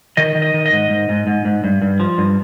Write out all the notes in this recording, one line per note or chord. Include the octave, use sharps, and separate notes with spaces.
D#3 D#5
D#3
D#5
D#3
D#5
G#2
G#2
G#2
G#2
G#2
G2
G2
F3
G2